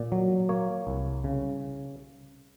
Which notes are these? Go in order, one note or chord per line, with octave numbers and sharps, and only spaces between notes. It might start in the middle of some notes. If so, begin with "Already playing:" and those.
Already playing: A#2 D5
F#3
A#3 C#5
C2
C#3